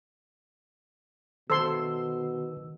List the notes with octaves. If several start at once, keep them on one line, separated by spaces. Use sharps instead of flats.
B2 D#3 A4 C5 C6 E6